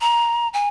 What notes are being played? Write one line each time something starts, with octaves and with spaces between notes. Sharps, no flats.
A#5
G#5